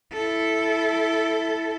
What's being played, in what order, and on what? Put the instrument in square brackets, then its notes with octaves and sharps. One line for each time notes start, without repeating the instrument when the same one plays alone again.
[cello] E4 A4